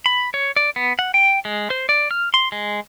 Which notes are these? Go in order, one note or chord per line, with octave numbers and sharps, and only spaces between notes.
B5
C#5
D5
B3
F#5
G5
G#3
C5
D5
F6
C6
G#3